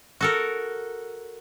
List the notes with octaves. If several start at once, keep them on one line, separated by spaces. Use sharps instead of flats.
F#4 A4 A#4